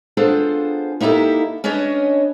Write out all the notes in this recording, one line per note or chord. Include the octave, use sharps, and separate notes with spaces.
B3 D4 F4 G#4 A4 C5
A#3 D#4 E4 G4 A4
C#4 D4 B4 C#5 D#5